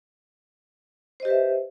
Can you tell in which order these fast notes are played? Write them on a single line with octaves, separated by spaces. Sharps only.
C5 D#5 G4 B4 E5